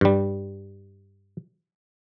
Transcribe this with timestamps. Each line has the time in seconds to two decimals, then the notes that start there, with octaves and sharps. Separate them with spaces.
0.01 G2 G3